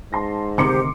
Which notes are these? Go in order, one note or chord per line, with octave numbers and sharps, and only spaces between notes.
G#2 A5 C6 A#6
D2 C3 D#3 G4 C5 C6 D6 C#7